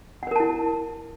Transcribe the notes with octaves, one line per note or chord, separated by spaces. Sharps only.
E4 A#4 B4 F#5 A5